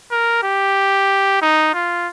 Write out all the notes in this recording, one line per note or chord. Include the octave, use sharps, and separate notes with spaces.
A#4
G4
D#4
F4